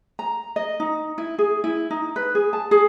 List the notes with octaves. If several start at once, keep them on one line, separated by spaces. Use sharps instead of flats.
A#5
D#5
D#4
E4
G#4
E4
D#4
B4
G#4
A5
G#4